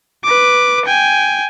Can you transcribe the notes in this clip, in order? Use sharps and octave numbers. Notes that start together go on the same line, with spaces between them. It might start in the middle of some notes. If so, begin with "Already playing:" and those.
B4 D6
G5 G#5